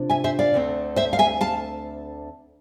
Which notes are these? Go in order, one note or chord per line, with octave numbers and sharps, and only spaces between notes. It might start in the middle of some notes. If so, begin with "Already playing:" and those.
Already playing: C3 D4 F4
E5 G#5
C5 E5
D5 F5
D2 D3 A3 C4
C5 E5
F5
E5 G#5
F5 A5